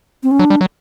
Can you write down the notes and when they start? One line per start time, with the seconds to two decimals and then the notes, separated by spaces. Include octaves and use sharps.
0.23 C4
0.31 C#4
0.39 F#3 D4
0.50 G3
0.61 F#3